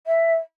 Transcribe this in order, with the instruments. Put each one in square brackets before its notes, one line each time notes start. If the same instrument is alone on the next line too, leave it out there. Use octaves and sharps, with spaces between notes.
[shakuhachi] E5